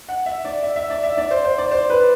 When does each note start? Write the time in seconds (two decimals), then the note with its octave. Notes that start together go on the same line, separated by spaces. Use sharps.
0.09 F#5
0.26 E5
0.45 D5
0.63 E5
0.76 E5
0.90 D5
1.03 E5
1.17 D5
1.31 C5
1.44 C5
1.58 D5
1.71 C5
1.90 B4